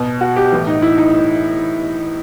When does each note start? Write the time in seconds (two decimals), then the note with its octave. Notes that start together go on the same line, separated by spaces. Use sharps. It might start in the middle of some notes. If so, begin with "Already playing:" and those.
Already playing: B2
0.21 F#4
0.36 G4
0.52 A2 E3
0.67 D#4
0.82 E4
0.98 D#4